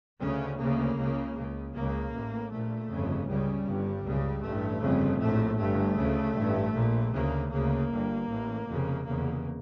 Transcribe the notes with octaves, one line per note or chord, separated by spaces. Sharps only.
D2 C#3 C#4
D2 C#3 A#3
C#2 C#3
C#2 C#3
C#2 C#3 A#3
A1 A2
A#1 A#2 A3
G1 F2 C#3
C#2 C#3 G3
G1 G2
C#2 C#3
A1 G2 A3
G1 F2 C#3
A#1 A2 A3
G1 G2 A3
D2 C#3
A1 G2
A#1 A#2
D2 C#3 A#3
D2 C#3 A#3
G1 G2
A1 A2
F1 F2 C#3
F1 E2 C#3 A#3